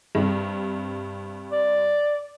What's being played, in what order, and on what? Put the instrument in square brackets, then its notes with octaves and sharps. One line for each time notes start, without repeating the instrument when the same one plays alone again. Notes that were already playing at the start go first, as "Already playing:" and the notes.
[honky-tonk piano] G2 C3
[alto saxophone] D5